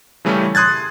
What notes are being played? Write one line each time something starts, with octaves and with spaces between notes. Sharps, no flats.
C#3 E3 G3 A3 C#4
C6 D#6 F#6 G#6 A6